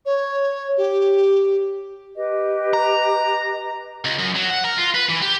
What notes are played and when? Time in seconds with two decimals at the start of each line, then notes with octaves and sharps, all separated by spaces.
0.06 C#5
0.77 G4
2.16 G4 B4 D#5
2.73 A#5
4.05 C#2
4.18 F#2
4.35 F#3
4.50 F#5
4.65 A#4
4.78 F4
4.95 B4
5.10 E3
5.22 G4